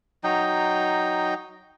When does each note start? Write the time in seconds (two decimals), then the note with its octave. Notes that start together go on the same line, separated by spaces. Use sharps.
0.24 F#3 D#4 G5